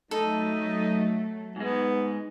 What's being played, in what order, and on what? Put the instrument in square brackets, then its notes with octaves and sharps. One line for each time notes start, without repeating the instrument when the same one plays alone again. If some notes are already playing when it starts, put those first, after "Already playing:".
[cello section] F#3 A3 [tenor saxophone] D#4 [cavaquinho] A4
[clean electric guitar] G#2 G#3 [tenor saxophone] B3